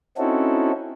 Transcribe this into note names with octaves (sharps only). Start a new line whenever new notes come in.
C4 C#4 D#4 E4 F#4 A4